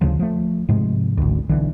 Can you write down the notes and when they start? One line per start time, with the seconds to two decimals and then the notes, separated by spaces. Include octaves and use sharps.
0.01 D2 C#3 F3
0.19 F3 A3
0.69 G#2 C3 F3 G#3
1.17 G#1 D2
1.49 B1 D3 E3